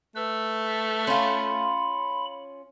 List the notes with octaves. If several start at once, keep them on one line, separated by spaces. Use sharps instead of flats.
A3 B4 E6
C#4 F4 B5 C6